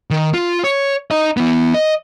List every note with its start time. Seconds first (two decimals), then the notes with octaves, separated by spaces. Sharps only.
0.10 D#3
0.34 F4
0.64 C#5
1.11 D#4 D#5
1.37 B3 E4
1.74 D#5